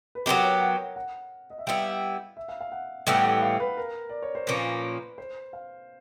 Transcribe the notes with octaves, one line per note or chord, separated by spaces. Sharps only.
B4
F#3 B3 D#4 G4 A#4
C#5
F#5
F#5
D#5
E5
G3 B3 E4 F5
E5
F5
F5
F#5
A2 E3 G3 B3 G5
F#5
F5
B4
A#4
D5
C#5
C5
A#2 F3 A#3 C#4 B4
C5
F5